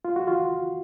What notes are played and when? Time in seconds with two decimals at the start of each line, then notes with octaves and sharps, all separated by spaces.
0.05 F4
0.16 F#4
0.28 F4